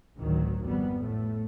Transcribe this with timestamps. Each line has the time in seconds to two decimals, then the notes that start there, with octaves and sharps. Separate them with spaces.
0.16 A1 D2 D#3 F#3
0.62 G#1 F2 G3 B3
0.99 A2 A3